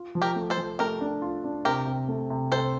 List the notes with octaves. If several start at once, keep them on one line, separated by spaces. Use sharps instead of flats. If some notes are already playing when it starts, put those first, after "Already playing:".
Already playing: F4
F3
G4 A#4
A3
A4 C5
F3
A3 G4 A#4
D4
F4
D4
C3 G4 A#4
C3
A3
C3
C3 A4 C5